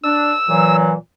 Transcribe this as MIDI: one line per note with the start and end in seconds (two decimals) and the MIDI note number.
0.04 0.32 62
0.04 0.76 88
0.48 0.92 46
0.48 0.92 52
0.48 0.92 54